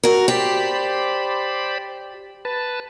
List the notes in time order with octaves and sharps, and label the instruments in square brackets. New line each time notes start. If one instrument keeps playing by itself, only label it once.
[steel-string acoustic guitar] F#4 A#4
[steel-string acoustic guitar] G4 [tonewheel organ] C5 D5 B5
[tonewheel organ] B4 A5